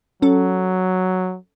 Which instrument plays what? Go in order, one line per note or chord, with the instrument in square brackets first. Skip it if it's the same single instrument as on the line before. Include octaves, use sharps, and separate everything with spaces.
[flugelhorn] F#3 [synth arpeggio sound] C#4 A4